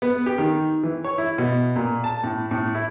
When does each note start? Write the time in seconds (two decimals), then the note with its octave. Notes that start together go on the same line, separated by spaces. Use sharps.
0.02 B3
0.26 G4
0.38 D#3
0.83 E3
1.04 C#5
1.18 E4
1.38 B2
1.76 A#2
2.04 A5
2.23 A2
2.51 A2
2.75 E4